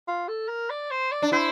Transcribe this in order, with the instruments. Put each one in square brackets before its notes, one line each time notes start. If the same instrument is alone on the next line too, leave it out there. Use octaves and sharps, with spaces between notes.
[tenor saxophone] F4
A4
A#4
D5
C5
D5
[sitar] D4
[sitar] E4 [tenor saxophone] C5